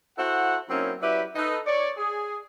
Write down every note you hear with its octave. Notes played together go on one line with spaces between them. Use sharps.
E4 F#4 A4 C5 F#5
F#3 A#3 C4 C#4 D#4 E4
F#3 E4 G4 B4 D5 E5
D#4 A4 B4
C#5 D5
G#4